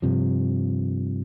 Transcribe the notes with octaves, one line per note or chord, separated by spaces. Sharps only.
G2 C3 F3